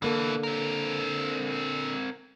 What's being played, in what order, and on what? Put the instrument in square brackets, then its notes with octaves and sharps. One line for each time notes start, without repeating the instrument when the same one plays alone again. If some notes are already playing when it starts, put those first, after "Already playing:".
[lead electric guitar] B2 E3 [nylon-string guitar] D3 A#3 A4
[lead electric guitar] C4 A#4